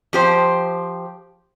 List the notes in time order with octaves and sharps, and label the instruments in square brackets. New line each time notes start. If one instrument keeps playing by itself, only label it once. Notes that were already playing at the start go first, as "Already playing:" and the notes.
[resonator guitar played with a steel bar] F3 G4 C5